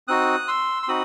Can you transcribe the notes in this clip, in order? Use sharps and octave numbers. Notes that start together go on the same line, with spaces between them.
C4 D#4 F#4 D#6 F#6
C6 E6
C6
C4 D#4 F#4 B5 D#6